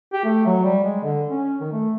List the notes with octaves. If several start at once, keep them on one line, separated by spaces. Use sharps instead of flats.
G4
A3
F#3
G3
G#3
D3
C#4
D#3
A3